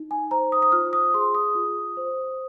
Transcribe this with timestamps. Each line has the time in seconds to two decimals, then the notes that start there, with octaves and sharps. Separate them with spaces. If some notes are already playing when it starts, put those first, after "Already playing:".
Already playing: D#4
0.11 G#5
0.31 C5 A#5
0.52 D#6
0.62 D#6
0.72 F4 F6
0.93 D#6
1.14 G#4 C6
1.35 D#6
1.55 F4
1.97 C5